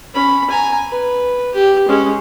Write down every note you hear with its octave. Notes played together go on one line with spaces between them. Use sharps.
C#4 B5
G#5 A#5
B4
G4
G#3 C#4